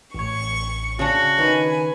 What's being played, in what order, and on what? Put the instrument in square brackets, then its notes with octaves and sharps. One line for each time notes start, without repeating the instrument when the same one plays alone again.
[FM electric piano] A1 C#5 [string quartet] C#6
[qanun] C#3 D4 [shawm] F#4
[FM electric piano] D#3 D#4 [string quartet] B4 G#5 [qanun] C#5